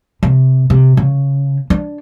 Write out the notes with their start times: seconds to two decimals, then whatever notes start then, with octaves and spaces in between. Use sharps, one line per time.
0.23 C3
0.70 C3
0.97 C#3
1.70 D4